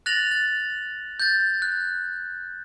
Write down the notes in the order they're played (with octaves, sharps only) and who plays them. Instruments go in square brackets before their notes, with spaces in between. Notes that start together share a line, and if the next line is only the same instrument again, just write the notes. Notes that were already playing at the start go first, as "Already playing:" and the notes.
[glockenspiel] F#6 A6 A#6 F7 F#7
A6
G6 A6
F#6